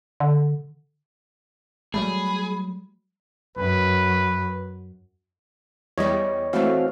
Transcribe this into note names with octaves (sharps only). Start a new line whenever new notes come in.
D3
F#3 G3 A3 G#4 B5
F#2 B4
E2 G3 C#5 D#5
E3 A3 C4 F#4 F5